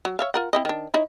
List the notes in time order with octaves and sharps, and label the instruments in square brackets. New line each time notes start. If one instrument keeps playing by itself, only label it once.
[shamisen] F#3
C#5 E5 F5
F4 A#4 F#5
C4 E4 D#5
D#3 D4
D#4 E4 C#5